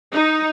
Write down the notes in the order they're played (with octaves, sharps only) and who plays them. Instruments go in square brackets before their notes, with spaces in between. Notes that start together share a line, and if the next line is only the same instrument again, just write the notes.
[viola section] D#4